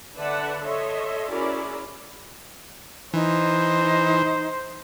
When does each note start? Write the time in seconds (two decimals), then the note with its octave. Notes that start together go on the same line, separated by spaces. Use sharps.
0.16 D3 B4 D5 E5 F#5 A5
0.64 A4 C#5 D#5 E5 C6
1.30 C#4 E4 F#4 G#4 A#4 D5
3.14 E3 D#4 C5